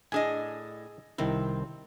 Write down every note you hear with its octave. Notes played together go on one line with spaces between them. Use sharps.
A2 D4 G#4 D#5 G#5
C2 D#3 C4 E4